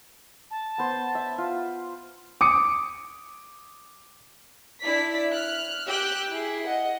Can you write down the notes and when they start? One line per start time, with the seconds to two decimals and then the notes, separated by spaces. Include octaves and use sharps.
0.51 A5
0.78 B3 C5
1.15 E5
1.38 F4
2.41 D6 D#6 C#7
4.82 D4 E4 D5 B6
5.32 F6 F#6
5.87 G4 G5 E6 F#6
6.29 E4 G#4
6.65 D#5 F#5